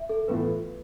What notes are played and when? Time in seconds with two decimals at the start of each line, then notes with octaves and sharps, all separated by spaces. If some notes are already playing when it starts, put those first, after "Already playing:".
Already playing: E5
0.09 A4
0.28 A2 E3 B3 F4 A4 B4